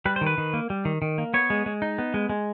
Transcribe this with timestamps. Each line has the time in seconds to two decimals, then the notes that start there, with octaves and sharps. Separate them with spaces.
0.06 G3 B4
0.16 C5
0.21 D#3
0.26 B4
0.38 D#3
0.53 A#3
0.70 G3
0.85 D#3
1.02 D#3
1.18 A#3
1.34 B3 C#5
1.50 G#3
1.66 G#3
1.82 D#4
1.98 B3
2.14 G#3
2.30 G#3